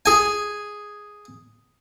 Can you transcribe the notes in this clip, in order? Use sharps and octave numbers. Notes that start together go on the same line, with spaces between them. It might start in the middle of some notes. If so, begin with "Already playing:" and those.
G#4 G#5